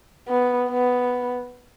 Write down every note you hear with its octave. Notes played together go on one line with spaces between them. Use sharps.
B3
B3